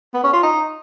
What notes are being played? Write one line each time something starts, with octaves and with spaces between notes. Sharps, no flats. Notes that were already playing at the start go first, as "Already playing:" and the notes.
B3
C#4
F4
D#4